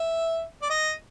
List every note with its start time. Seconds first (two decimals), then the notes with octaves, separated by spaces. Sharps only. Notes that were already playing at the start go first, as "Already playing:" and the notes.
Already playing: E5
0.62 D5
0.70 D#5